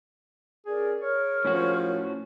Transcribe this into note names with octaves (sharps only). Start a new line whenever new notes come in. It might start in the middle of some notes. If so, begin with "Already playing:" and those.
C#4 G#4 A#4 D5
G#4 A#4 C#5 F6
A2 F3 C#4 F#4